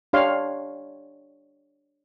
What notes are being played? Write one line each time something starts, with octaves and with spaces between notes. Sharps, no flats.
D4 G4 C#5 F5 C6